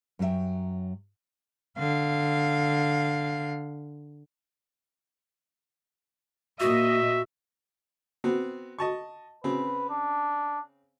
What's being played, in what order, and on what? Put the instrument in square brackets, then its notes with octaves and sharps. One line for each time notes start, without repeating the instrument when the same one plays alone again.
[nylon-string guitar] F#2 F#3 F4 E5 G5
[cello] D3 F5
[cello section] A#2 D#5 [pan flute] F#4 [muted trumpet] E5
[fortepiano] B3 C4 F#4
D#5 A5 C#6
[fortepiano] C#3 C4 [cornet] B4
[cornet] D4